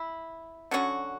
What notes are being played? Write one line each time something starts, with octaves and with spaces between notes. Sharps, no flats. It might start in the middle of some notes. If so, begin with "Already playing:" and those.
Already playing: E4
D3 F#3 C#4 F#4